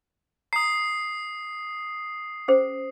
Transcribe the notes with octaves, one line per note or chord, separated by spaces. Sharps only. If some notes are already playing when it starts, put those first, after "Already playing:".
A#5 D#6 C7
C#4 G#4 C5